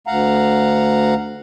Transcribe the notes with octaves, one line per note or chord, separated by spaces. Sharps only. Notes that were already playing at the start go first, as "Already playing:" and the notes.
D2 F5 F#5 A#5